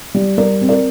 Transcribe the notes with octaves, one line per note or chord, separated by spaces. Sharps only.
G3
G3 A#4 D5
C4
A#4 D5